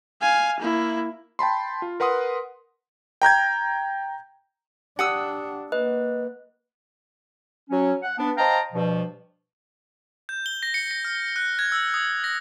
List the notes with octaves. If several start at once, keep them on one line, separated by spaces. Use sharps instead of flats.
F5 G#5
A#3 E4
G5 A5 B5 C6
F4
A#4 B4 F#5 C6 D#6
G5 A#5 G6 G#6
D4 G4 F#5 D#6 E6
A#3 B4 D#5
F#3 C#4
F#5
B3 D4
C5 D#5 F5 G5 A5 A#5
G2 B2 F3
G6
G7
A#6
C#7
A#6
F6
F#6
G#6
E6
D#6
A#6